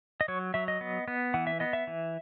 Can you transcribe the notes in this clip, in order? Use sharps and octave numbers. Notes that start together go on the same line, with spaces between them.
D#5
F#3 C#5
F#3 E5
D#5
B3
B3
E3 F#5
E5
B3 D#5
E5
E3